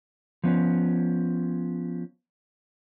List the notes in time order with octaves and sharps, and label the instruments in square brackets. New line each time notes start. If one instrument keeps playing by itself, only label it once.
[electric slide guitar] F3 B3 C#4